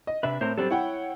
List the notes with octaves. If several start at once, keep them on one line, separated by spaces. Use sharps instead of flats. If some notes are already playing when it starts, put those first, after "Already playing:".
D#5
C3 D4 B4 E5
A2 C4 A#4 C5
F#3 G3 C4 D4 A4
E4 C#5 F#5 G5